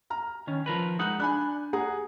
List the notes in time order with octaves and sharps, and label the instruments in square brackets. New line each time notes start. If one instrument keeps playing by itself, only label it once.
[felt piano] A#5 F6
[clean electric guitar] D#3 C#4
F3 A#4 B4
[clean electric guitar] G#3 D#4 F#5 [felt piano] D#6 F#6 G6
[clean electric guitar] D4 [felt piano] G#5 B5 F#6
[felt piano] G#4 F#5 A#5